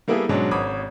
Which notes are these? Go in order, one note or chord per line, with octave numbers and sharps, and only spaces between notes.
G3 A#3 B3 E4 G#4 A4
G#2 B2 F#3 G#3 C#4 D4
G#1 C#5 B5 D6 D#6